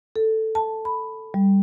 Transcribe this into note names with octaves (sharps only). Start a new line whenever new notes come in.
A4
A5
B5
G3